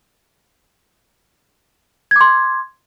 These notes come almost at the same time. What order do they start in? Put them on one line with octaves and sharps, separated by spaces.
G#6 D6 C6